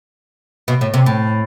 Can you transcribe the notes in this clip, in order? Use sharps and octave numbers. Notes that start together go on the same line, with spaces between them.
B2
A2
C3
A2